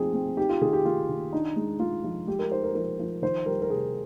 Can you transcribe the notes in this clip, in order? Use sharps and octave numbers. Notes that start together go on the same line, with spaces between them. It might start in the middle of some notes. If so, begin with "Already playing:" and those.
Already playing: F3 C4 D#4 G#4
C4
D#4 G4
F4
D#3 G#4
G4
D#3 F4
D#3
D4 D#4
G#3
G#3 F4
F3
G#3 G4
A#4
D#4 C5
A#4
F3 A#4
F3
D#3 C5
G3 A#4
A#4
C3 G#4